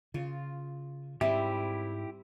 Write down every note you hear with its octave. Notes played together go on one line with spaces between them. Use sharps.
C#3 F4
G#2 G3 C4 E4 G4 E5